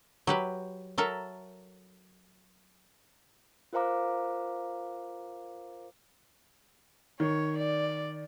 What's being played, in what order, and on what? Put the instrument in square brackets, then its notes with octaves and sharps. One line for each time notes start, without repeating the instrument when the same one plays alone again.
[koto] F#3 G4 B4
F#3 A4 A#4 E5
[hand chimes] F4 A#4 C5 F5 A#5 D6
[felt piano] D#3 [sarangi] C#5
[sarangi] D5